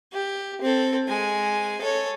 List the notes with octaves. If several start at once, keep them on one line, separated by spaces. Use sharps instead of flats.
G4
C4 A4
G#3 G#5
A4 C#5